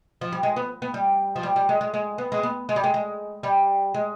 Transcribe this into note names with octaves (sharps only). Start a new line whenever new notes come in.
F3
G3
G#3
B3
B3
G3
F3
G3
G3
G#3
G#3
G#3
B3
G#3
B3
G#3
G3
G#3
G#3
G3
G#3